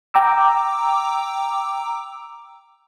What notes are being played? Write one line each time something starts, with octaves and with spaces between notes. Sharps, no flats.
G5 A#5 D6 E6